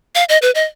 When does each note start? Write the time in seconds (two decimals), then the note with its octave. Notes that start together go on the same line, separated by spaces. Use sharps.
0.15 F5
0.29 D#5
0.42 B4
0.55 D#5